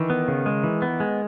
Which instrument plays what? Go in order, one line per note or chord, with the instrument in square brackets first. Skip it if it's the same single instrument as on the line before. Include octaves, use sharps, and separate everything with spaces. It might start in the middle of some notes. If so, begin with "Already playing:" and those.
Already playing: [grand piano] D#3 [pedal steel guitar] E3
[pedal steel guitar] B3
C#3
G#3
E3
B3
G#3